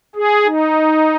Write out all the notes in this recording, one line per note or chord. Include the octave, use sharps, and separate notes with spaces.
G#4
D#4